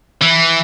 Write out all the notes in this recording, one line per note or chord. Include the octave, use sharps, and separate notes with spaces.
E3